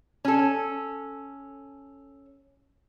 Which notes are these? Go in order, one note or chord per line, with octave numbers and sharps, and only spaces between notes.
C#4 A4